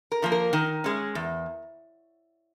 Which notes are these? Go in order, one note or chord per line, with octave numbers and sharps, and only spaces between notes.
A#4
D3 F3 A#3
A#4
D#3
G#3 C#4
E2